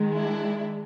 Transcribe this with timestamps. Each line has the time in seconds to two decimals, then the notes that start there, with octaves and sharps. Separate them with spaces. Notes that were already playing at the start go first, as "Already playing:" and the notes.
Already playing: D#3 G#3
0.13 D4 E4